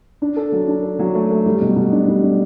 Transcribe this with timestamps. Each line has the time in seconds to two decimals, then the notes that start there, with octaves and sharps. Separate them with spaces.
0.22 D4
0.36 A4
0.52 F#3
0.68 D4
0.83 A4
0.99 F#3
1.15 A3
1.31 A3
1.46 G3
1.61 B2
1.76 B2
1.92 D4
2.08 G3
2.23 D4